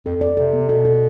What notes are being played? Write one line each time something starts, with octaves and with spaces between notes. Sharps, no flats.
F2 A4
F2 D5
C3 A4
B3
B2 A4
A4